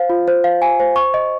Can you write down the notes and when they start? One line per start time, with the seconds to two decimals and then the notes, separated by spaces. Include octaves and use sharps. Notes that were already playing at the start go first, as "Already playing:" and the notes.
Already playing: C5 F5
0.10 F4
0.28 C5
0.44 F5
0.62 G#5
0.80 C5
0.96 C#6
1.14 D#5